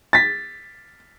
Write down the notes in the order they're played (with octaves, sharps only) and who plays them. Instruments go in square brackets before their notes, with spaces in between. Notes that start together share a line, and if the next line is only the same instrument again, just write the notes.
[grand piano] A6 B6